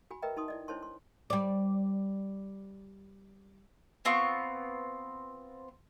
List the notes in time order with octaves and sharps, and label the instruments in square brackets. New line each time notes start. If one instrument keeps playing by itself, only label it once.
[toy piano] F#4 G#5 B5
A#4 B4 D#5 E5 G5 A#5
D#4 A5 C6 D#6
E4 D5 D#5
D4 E4 C5 C#5 A5 C6
C6
[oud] G3 D5
[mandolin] B3 C4 F4 C#6